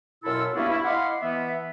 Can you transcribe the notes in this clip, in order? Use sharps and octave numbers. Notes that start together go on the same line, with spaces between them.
F#2 B2 E4 F4 A4 E6
G2 A#3 B3 C#4 D4 E4
E4
D#5 F5 F#5 B5 C6 D6
E3 B3 E5